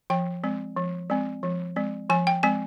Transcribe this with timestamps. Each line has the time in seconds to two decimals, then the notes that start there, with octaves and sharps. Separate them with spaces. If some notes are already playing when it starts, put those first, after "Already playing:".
0.10 F3 G5
0.44 G#3 C4
0.77 F3
1.10 G#3 C4
1.43 F3
1.76 G#3 C4
2.10 F3 G#5
2.27 G5
2.43 G#3 C4 G#5